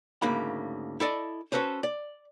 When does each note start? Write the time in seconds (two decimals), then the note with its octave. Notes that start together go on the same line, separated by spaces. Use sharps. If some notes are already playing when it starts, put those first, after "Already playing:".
0.22 D2 G#2 C#3 A#3 B5
1.00 E4 A4 D5 D#5
1.52 C#4 F#4 A4 B4 C5
1.83 D5